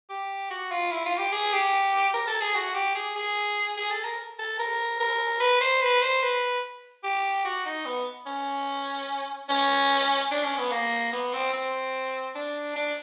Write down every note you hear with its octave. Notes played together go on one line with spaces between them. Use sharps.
G4
F#4
F4
E4
F4
G4
G#4
G4
A#4
A4
G#4
F#4
G4
G#4
G#4
G#4
A4
A#4
A4
A#4
A#4
B4
C5
B4
C5
B4
G4
F#4
D#4
B3
C#4
C#4
D4
C#4
B3
A#3
B3
C4
C4
D4
D4